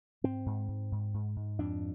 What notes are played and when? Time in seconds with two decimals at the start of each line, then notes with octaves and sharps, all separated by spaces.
0.24 G#2 C4
0.46 G#2
0.68 G#2
0.92 G#2
1.14 G#2
1.36 G#2
1.59 F2 D4